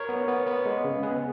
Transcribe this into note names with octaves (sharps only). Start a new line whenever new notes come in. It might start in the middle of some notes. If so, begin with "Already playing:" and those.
Already playing: A#4 C#5
B3
B3
B3
G#3
C#3
B3 G#4 B4